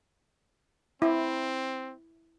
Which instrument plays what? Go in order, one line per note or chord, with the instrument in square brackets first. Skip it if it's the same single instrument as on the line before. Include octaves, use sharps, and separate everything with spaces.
[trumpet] C4 [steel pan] E4